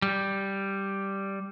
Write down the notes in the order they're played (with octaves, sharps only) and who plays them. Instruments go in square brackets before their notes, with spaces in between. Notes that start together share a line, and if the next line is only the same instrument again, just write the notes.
[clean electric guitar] G3